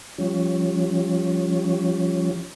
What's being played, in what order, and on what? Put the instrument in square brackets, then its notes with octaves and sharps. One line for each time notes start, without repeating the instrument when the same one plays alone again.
[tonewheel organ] F3 G3 C#4